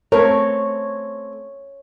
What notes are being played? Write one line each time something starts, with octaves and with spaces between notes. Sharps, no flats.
A3 C4 A#4 C#5